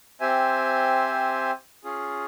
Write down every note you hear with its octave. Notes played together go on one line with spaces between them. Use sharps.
C4 G4 C5 E5 G#5
C#4 F4 G#4